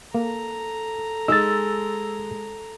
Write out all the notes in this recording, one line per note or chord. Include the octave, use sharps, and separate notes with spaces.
A#3 A4 A#5
G#3 D#4 G#4 D#5 E6 A6